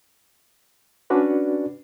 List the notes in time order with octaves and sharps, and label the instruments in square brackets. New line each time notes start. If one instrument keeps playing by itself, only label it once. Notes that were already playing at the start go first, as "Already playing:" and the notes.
[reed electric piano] C#4 D4 F#4 B4 D5